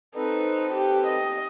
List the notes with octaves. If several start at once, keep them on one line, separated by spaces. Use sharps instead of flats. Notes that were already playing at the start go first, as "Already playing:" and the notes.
C4 D#4 A4 B4
G4
D#5